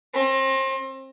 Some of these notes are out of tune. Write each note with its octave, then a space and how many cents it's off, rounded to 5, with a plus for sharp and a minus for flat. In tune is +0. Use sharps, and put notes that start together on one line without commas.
C4 +35